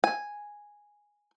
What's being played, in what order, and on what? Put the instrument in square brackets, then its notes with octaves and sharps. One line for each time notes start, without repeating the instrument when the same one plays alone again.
[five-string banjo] G#5